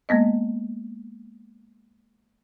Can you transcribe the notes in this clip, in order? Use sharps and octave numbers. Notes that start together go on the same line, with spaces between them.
G#3 A#3 B3 D#5